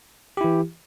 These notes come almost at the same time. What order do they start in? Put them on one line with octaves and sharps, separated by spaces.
G4 E4 E3